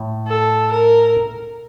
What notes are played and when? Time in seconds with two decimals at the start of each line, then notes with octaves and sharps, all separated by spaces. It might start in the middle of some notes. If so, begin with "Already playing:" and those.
Already playing: A2
0.28 A4
0.73 A#4